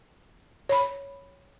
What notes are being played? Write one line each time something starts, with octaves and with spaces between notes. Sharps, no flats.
C#5 B5